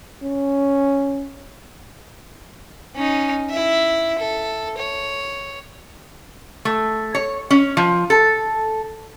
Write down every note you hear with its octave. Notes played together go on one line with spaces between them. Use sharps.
C#4
C#4 D#4
E4 E5
A4
C#5
A3
C#5
C#4
F3
A4